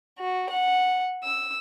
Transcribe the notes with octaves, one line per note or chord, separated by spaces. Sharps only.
F#4
F#5
E6